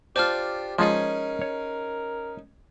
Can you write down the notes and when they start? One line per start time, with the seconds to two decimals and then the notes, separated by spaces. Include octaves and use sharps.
0.16 D4 F4 G4 C5 A5 F6
0.79 F3 G#3 C#4 D#4 F4 G#4 A#4
1.42 C#5